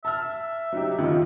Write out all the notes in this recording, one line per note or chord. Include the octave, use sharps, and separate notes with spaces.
E5 A5 F6
F#3 D#4 G4
F2 D#3 A#3